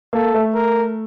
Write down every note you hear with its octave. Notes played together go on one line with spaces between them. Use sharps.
A#3 A4
A3
A#4